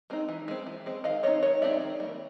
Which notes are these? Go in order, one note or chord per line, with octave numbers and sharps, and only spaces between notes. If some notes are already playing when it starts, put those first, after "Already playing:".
G#3 C4 D#4
E3
G#3 C4
E3
G#3 C4
D#3 D#5 F5
G#3 C4 D#4 C#5 D#5
D#3 C#5 D#5
G#3 C4 D#4 D5 E5
D#3
G3 A#3